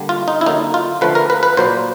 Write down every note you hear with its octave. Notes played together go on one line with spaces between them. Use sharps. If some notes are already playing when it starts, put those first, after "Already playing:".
Already playing: D3 G3 A#3
F4
D#4
E4
D3 F#3 A#3 D#4
F4
D3 F3 A3 B4
A#4
B4
B4
A#2 F#3 A#3 C5